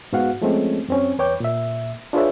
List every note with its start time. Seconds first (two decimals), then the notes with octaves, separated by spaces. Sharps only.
0.13 G#2 B3 F#4 F5 F#5
0.42 F3 G#3 A3 C4 C#4
0.88 F#2 C4 C#4
1.18 E2 B4 C#5 G5 D6 G6
1.40 A#2 E5
2.13 D4 F4 G#4 B4 C#5 E5